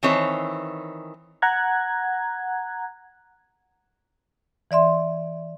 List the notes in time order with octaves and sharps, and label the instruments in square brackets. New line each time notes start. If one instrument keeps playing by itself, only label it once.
[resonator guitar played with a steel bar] D#3 E3 C4 C#5
[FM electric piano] F#5 A#5 F#6 G#6
[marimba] E3 D5 E5 C6